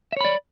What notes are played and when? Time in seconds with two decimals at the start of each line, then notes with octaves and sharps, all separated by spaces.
0.12 E5
0.17 C#5
0.21 B5
0.25 D5